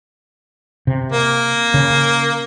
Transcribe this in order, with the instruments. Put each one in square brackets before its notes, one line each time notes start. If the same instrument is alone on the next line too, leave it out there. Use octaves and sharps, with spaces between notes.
[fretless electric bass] C3
[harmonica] A#3
[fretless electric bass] C#3